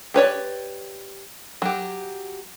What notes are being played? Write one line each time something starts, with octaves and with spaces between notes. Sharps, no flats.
G4 B4 C#5 D5
F#3 G4